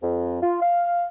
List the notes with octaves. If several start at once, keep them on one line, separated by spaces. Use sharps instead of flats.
F2
F4
F5